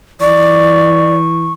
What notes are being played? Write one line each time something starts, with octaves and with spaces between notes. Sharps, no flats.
E3 D5 C#6